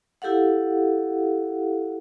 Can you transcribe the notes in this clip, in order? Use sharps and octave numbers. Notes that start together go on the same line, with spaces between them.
E4 G4 A4 F5 F#5